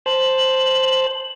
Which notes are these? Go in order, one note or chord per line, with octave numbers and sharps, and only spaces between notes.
C5 A5 F#7